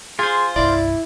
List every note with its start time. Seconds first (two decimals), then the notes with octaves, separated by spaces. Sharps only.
0.19 F4 G#4 C5
0.56 G1 C2 E4 D5